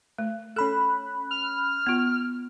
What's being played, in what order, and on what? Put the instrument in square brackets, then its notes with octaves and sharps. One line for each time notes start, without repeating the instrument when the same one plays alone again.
[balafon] A3
[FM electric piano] C#4 B5 F#6 [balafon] A4
[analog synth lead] F6
[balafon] B3 F4